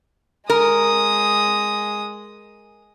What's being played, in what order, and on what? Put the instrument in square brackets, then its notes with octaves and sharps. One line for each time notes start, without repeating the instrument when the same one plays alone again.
[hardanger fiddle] G#3 D#6 [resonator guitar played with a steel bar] A#4